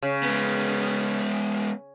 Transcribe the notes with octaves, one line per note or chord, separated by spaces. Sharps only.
C#3
G#3 B3